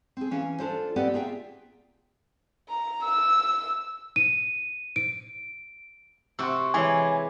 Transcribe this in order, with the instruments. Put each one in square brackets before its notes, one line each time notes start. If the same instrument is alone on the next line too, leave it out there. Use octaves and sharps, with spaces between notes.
[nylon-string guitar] C4 G#4
E3 C#4 F5
D4 F4 A4 C5
B3 C4 G4 B4 D5 F#5
A#3 F4 G#4 E5 G5
[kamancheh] A#5
E6
[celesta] D#7
D7
[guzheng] C3 F#4 [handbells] C6 C#6 E6
[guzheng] E3 G#3 [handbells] C#5 D6 [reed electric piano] G#5